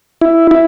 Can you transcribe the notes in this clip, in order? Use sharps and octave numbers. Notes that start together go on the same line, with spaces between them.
E4
E4